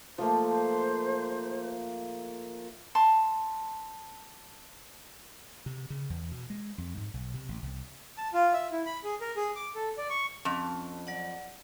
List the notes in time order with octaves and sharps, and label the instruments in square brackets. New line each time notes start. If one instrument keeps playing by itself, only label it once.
[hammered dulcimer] F3 A3 A#3 [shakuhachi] C5
[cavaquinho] A5 C6
[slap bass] C3
C#3
E2
B2
G#3
F2
G#2
B1
C3
A1
C2
[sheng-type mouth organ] A5
F4
E5
E4
B5
G#4
A#4
G#4
D6
A4
D5
C#6
[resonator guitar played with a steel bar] F2 [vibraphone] C#4
[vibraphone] F#3 D5 F#5